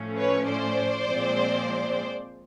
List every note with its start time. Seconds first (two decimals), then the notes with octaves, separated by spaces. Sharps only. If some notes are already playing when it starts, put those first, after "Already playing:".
Already playing: A2 F3 A3 C#4
0.17 B4 C#5
0.47 C5 D5
1.06 A#2 F3 G#3 C4